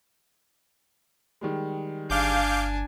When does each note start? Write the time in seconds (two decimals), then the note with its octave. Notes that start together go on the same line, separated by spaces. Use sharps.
1.41 D#3 G3 G#3
2.10 G1 D4 F5 G#5 D6 G6